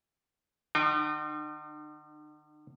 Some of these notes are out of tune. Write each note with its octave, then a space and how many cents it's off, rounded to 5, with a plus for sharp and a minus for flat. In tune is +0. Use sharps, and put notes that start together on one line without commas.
D3 +45 D#4 -40 G5 +0